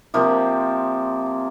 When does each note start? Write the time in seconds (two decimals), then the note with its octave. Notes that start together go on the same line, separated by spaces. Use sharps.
0.14 C3 F3 A#3